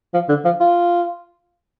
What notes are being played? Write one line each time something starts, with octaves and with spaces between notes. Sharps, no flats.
F3
D3
F3
F4